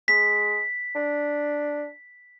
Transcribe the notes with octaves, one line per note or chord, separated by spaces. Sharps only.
G#3 B6
D4